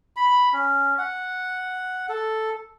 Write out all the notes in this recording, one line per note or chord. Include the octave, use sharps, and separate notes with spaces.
B5
C#4
F#5
A4